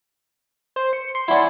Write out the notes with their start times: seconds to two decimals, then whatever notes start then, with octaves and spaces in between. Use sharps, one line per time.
0.76 C5
0.93 C#7
1.15 C6
1.28 C#4 E4 D5 F#5